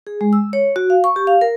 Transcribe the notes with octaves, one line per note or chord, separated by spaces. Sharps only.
G#4
G#3
E6
C#5
F#4
F5
C#6
G4
F5
A#4